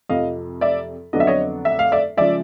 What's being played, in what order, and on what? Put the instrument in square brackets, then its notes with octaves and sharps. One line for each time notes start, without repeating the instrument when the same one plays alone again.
[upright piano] F2 C3 F3 D#5 F5
D5 E5
F2 D3 F#3 B3 D4 D#5
E5
C#5 D#5
E5
F5
D5 E5
C#3 F3 G#3 D5 E5